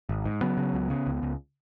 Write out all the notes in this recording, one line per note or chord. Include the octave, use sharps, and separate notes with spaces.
G#1
G#2
C#3 F#3 B3
C#3
C#2
C#3
C#2
C#2